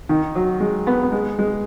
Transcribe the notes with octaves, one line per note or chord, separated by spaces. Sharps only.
D#3
F#3
G#3
B3
B3
G#3
G#3